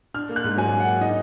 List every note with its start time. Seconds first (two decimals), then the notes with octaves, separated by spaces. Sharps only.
0.14 D4 F6
0.29 A#3
0.36 F#6
0.44 G#2
0.57 F#3 G#5
0.72 D4
0.80 F#5
0.86 A#3
1.01 D#4 D#5